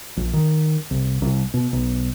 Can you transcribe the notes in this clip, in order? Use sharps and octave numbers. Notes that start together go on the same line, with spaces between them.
A#1
D#3
C2
C2
B2
B1